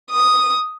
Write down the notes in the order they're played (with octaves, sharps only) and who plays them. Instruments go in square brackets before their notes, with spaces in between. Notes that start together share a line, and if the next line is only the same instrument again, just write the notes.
[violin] D#6